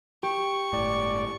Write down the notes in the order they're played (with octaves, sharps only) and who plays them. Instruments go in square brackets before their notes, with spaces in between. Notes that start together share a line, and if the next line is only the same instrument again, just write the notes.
[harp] G4 [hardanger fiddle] C#6
[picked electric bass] G1 A2 [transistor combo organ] D5